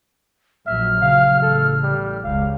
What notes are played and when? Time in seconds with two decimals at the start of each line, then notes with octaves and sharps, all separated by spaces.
0.66 A#1 F#3 E5 F6
1.01 C#3 F5
1.42 A1 A4
1.83 G3
2.24 E1 C#2 F5